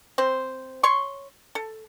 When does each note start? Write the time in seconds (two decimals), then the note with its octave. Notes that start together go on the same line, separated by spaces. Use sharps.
0.18 C4 C5
0.83 C#5 C6 C#6
1.55 A4